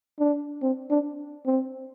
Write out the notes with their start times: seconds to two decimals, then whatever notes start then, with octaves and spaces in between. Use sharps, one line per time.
0.20 D4
0.62 C4
0.90 D4
1.46 C4